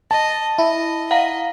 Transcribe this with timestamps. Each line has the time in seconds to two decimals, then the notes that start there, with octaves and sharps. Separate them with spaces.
0.11 D#5 A5
0.58 E4 D#5
1.11 D#5 F5 F#5 A#5